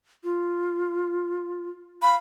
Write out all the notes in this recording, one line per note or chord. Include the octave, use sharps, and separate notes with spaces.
F4
F5 B5